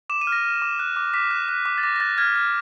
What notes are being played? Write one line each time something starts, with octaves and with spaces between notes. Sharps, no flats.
D6 E7
D#7
F6
A#6
F6
D6
F#6
D6
D6 B6
F#6
F#6
D6
A6
D6 A#6
A#6
F#6 A6
F6 G#6
F6